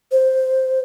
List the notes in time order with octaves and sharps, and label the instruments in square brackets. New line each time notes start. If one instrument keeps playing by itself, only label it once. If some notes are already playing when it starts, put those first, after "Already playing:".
[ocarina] C5